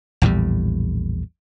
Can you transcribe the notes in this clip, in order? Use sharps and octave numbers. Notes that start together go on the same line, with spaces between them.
A#1 E2 A2 G3